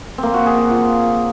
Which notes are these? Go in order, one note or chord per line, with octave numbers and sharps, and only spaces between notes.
A#3 C4
F#4
G#4
F#4
F4